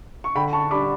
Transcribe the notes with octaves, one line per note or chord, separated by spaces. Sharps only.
C#6
D3 G5 B5
A5 C#6
G3 D4 B5 D6